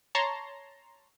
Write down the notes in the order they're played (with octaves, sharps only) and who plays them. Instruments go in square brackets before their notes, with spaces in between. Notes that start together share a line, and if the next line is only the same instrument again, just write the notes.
[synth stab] C#5 A5 A#5 C6